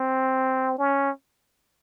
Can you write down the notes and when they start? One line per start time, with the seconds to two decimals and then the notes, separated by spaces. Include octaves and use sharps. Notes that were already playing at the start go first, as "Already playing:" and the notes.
Already playing: C4
0.78 C#4